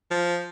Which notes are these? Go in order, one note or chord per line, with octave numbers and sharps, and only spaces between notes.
F3